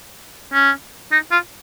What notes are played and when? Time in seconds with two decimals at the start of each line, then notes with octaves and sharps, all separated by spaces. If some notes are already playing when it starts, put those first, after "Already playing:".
0.53 C#4
1.12 D#4
1.32 F4